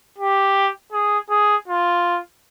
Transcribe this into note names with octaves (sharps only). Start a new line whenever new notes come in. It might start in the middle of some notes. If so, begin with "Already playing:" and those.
G4
G#4
G#4
F4